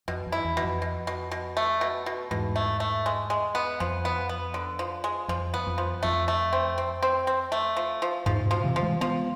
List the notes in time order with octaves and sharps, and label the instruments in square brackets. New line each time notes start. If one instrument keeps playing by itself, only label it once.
[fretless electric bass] F2 [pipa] B2
[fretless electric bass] F2
[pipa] E4
[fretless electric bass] E2
[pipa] B2
[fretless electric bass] F2
[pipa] B2
B2
B2
A3
B2
B2
[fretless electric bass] E2 G#2 [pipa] B2
[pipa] A3
A3
G#3
G#3
B3
[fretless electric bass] F2 [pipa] F3
[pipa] B3
B3
D3
F3
G#3
[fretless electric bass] F2 [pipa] F3
[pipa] B3
[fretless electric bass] F2
[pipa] F3
[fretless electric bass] F2 [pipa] A3
[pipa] A3
C4
C4
C4
C4
A3
F3
F3
[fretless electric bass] E2 G#2 [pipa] F3
[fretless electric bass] G#2 B2
[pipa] F3
[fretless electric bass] C3 E3
[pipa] F3
[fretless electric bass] E3 G#3
[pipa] F3 [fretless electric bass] G#3 B3